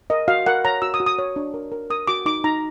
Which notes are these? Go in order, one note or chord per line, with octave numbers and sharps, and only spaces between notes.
A#4 D#5
F#4 F5
A#4 F#5
C#5 A#5
F#4 E6
D#6
F#4
D#6
C#5
D4
A#4
A#4
A#4 D#6
F#4 D6
D#4 D6
D#4 A#5